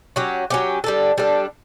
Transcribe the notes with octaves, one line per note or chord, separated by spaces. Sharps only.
F#3 C#4 G4
F#3 C#4 G4
G3 D4 A4
G3 D4 A4